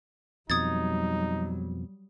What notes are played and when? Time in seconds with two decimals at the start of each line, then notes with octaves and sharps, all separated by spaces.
0.50 F2 B2 F#3 G3 D#4 D#6 G#6 A6